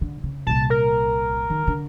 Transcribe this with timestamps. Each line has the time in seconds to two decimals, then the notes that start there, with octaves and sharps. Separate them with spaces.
0.01 D3
0.23 C#3
0.47 C2 A#2 A5
0.70 A#4
1.50 D#3
1.67 D3